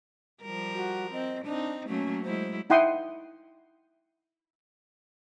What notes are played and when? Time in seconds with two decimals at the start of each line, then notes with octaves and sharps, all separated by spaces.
0.42 F3 G3 A#4
0.75 F#4
1.13 C4 D#5
1.45 C4 D4 D#4
1.89 F#3 A3 A#3 C#4
2.24 F#3 G#3 E4 C5
2.70 D#4 E4 F#5 G5 C6 D#6